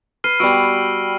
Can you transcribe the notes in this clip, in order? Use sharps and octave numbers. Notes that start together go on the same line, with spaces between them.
B4 F6 C7 D#7
G3 B3 F#4 E6 D7 D#7